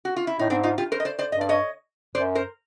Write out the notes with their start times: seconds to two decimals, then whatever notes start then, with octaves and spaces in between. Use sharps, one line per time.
0.05 F#4
0.16 F4
0.27 E4
0.39 A2 D#4
0.50 G#2 C4 D4
0.63 D#4 F4
0.78 F4 G4
0.92 A#4 C5
1.00 D#5
1.05 C5 D5
1.19 C5 D5
1.32 G2 D#5
1.41 D5
1.49 C#5 D#5
2.15 F#2 C5 D5
2.35 A#4 C5